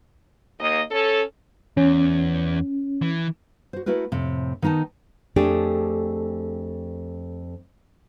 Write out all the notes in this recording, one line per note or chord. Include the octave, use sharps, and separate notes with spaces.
D#2 A#3 D#5
C#4 A4
E2 C#4
E3
F#4 C5
A3 E4 F#4 A#4 B4
F2 A2 C3
D#3 B3 D#4 G5 A5
F2 A3 D4 G4 G#4